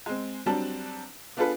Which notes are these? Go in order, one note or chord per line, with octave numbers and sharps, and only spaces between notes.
G#3 C4
F#3 G3 C4 D4 A5
B3 D4 F4 G#4 A4 B4